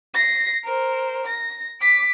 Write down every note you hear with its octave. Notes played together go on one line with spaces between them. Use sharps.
A#6 C7
A#4 C5
A#6
D6 B6